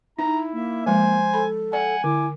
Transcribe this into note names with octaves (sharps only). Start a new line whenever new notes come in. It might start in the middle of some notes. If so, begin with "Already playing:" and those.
D#4 E4 A#5
A#3 E5
F3 G#3 C5 G#5
A4 B5
D5 F#5 G#5
D3 E4 D6